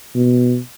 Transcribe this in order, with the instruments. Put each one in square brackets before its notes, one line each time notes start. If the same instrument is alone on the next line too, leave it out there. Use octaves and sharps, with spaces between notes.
[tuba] B2